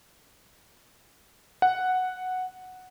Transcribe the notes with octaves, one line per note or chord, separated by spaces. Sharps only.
F#5